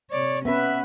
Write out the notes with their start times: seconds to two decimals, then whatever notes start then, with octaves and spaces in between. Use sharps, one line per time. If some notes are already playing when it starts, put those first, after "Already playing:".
0.11 C3 C#5 D5
0.45 B3 C#4 B4 E5